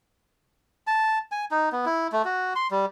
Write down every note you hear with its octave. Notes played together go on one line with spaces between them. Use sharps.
A5
G#5
D#4
B3
E4
A3
F#4
C6
G3